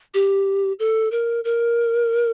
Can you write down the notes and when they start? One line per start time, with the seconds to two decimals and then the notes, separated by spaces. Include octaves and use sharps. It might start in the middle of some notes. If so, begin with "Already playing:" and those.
0.14 G4
0.79 A4
1.11 A#4
1.44 A#4